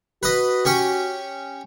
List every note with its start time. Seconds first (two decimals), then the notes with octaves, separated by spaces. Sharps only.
0.23 F#4 B4 D#5
0.65 C#4 G4 C#6